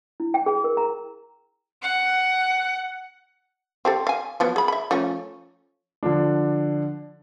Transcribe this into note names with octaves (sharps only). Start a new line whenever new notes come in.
E4
G5
G#4
A#4
A#5
F#5
C4 G4 A4
F5 G#5
F3 F#3 B3
G#4 B5
E5 B5
F3 A3 C#4
D3 F3 D4